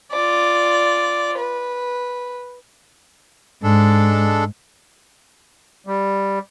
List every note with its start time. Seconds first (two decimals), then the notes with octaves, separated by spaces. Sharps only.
0.12 F4 D5
1.38 B4
3.63 G#2 G#3 D4 A4
5.87 G3